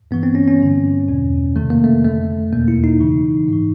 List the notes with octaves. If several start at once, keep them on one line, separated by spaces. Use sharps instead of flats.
G2 E3 B3
C4
C#4
C#4
G2 D3
E2 B2
F2 C3 D#3 A3
A#3
A3
F2 D3 A3
E2 B2 A#3
E4
D#4
F#2 C#3 E3
G#2 E3